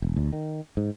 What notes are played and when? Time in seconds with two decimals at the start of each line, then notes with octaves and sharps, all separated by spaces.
0.02 E1
0.16 D2
0.33 D#3
0.77 G#2